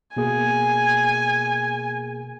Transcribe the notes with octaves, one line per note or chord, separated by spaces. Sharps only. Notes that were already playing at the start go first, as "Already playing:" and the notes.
B2 A#3 G#4 G#5